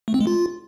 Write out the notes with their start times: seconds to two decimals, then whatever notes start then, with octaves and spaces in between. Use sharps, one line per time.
0.08 A3
0.14 C4
0.21 G#3
0.27 F4